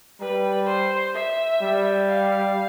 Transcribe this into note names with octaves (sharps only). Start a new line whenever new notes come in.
G3 B4
C5
E5
G3
F5